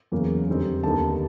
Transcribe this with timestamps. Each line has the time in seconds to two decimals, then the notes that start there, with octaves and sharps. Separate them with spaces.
0.12 E2 C#3 F#3 A#3
0.48 F2 D3 G3 C4 D#4
0.83 D#2 D3 G3 B3 D#4 A5